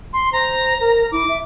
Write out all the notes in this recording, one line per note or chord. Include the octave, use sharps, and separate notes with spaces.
C6
C5 A#5
A#4
E4 D6
E5